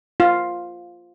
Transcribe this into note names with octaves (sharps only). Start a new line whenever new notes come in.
F4